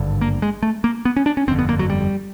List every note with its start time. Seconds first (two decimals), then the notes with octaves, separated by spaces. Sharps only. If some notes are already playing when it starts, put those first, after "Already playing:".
Already playing: G#1 G2 D3
0.21 A#3
0.42 G#3
0.63 A3
0.84 A#3
1.05 B3
1.16 C#4
1.26 D4
1.37 C#4
1.47 G1 F2 D3 C4
1.59 B3
1.69 A#3
1.79 F#3
1.90 G3